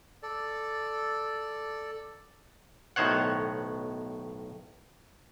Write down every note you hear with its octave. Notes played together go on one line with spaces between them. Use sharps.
A4 D5
B1 A2 D#3 C5 C#5 F#5